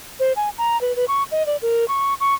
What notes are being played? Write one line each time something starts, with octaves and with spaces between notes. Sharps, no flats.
C5
G#5
A#5
B4
B4
C#6
D#5
D5
A#4
C#6
C#6